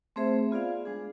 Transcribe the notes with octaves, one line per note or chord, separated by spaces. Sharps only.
A3 C4 G#4 C5 E5
B3 F4 G#4 D5 F5
G#3 D4 G#4